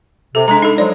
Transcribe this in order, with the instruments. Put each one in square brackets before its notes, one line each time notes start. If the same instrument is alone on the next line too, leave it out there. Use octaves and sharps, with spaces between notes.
[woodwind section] C3 [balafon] A4
[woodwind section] G#3 [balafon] D4 A#5
[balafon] D#4 A4
[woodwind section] F3 F#3 G#3 [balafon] D5